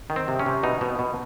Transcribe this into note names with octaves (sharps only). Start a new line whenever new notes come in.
D#3
C4
C3
C#4
C3
B2 D#4
B2
B2